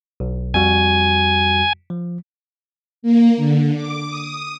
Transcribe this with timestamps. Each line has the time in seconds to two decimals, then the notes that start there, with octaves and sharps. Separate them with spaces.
0.20 B1
0.54 F2 G3 F#4 G#5
1.90 F3
3.02 A#3
3.37 D3
3.74 D6
4.07 D#6